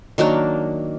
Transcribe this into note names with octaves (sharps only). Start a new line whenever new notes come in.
D#3 F#3 A#3 D4